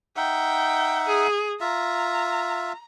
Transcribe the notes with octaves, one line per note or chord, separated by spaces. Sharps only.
D#4 E5 F#5 G5
G#4
F4 E5 A#5